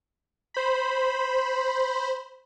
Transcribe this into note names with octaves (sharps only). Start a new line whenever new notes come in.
C5 B5